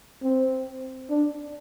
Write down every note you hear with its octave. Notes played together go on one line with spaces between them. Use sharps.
C4
D4